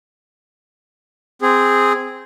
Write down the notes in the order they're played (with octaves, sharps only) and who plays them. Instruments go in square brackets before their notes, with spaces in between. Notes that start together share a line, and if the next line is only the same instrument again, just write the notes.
[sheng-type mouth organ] C4 G#4